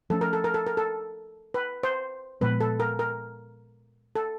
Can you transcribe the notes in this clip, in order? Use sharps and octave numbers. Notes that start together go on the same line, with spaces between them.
F3 A3 C#4 A4
A#4
A4
A#4
A4
A#4
A4
B4
C5
A#2 F3 G#3 B3 B4
A4
A#4
A#4
A4